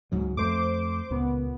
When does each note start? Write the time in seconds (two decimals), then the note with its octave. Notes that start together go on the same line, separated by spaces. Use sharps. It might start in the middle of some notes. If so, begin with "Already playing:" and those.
0.12 C#2 G#2 F#3
0.37 F2 A3 C5 D6
1.10 C#2 A#2 B3